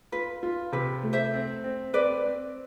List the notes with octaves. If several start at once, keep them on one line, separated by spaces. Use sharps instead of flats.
F4 B4
F4
C3 B4
A3
C5 E5
C4
C4
C4 B4 D5
C4